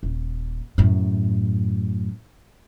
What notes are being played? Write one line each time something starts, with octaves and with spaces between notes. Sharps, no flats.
D#1
F#2 A2